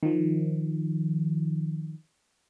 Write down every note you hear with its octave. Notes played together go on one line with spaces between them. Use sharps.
D#3 F3